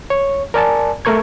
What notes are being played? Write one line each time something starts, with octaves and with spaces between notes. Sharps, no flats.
C#5
A#4 D5 G#5 A5
A3 A#4 C#6 G#6